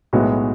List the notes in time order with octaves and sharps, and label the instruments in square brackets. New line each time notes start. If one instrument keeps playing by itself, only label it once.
[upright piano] B1 A2 G#3 B3 F#4